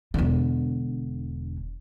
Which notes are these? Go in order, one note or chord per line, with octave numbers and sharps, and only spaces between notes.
E1 D3